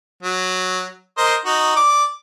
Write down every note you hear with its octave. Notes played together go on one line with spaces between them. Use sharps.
F#3
A#4 C5 D#5
D#4 F#4
D5 D6